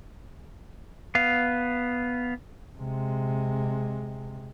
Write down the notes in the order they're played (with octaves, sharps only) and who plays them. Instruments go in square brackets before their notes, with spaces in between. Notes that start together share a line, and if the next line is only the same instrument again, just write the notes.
[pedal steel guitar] B3 F5
[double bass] C3 G#3